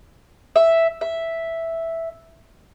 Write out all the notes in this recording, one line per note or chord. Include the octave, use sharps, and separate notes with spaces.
E5
E5